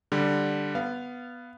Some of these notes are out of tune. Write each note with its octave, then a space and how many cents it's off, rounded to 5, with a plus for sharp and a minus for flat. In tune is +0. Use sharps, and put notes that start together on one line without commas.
D3 +5 G3 +0
B3 +0 F5 -15